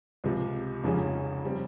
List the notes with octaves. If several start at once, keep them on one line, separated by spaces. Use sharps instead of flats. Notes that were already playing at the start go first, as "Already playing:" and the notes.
C#2 C3 F3
F1 F2 C#3 G#3 C#4
G3 C4